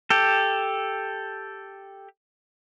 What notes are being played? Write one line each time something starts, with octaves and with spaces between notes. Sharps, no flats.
G4 A4